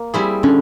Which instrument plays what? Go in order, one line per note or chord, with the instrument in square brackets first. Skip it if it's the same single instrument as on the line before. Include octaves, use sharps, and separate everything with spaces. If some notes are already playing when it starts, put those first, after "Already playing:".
Already playing: [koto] A#3
G3 C4 E4 G#4
[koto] D3 [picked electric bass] C#4